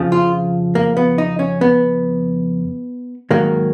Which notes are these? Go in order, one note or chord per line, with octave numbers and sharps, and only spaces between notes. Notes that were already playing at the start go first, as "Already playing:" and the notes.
Already playing: F2 C#3 F3
F4
A#3
B3
D#4
C#4
B3
G#2 D#3 F#3 A#3